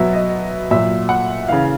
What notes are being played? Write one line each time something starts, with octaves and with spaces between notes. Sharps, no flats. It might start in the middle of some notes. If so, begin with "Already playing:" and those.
Already playing: B2 F#3 E5
D#5
A#2 F#3 E5
F#5
C#3 E3 F5